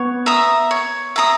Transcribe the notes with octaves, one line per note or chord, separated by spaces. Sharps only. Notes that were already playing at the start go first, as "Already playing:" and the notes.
Already playing: B3 C#5
E5 A#5 D#6
C#5
E5 A#5 D#6